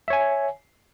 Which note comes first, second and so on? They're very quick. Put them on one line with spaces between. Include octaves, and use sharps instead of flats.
E5 C#5 G#5